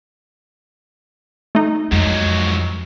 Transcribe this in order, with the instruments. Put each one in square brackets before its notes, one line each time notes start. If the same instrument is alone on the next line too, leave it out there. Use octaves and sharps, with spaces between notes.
[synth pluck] A3 D#4
[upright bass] F2 [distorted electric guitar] G#2 F#3